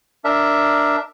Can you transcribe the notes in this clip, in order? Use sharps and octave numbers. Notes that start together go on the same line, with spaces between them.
D4 A#4 E5